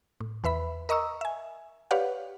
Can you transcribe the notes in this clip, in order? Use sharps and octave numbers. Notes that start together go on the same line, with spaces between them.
A2
E2 B4 E5 B5
A#4 D#5 A#5 C#6 D#6 E6
E5 G#5
G4 B4 C#5 D5 F5 F#5